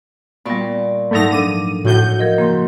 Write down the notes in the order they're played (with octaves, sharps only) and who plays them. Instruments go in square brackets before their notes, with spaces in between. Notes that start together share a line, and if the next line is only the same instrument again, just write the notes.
[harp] A#2 D5 C#6 [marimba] G3 B3
[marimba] G#2 F#3 D#4 [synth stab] A3 A#6
[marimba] F3 D4 A4 [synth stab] D#7
[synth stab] A2 G6 [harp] F#4
[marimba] F3 A#4 D#5
[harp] C#3 [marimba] A#3 C6